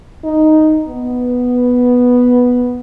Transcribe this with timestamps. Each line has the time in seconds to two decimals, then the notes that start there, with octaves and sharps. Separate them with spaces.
0.24 D#4
0.87 B3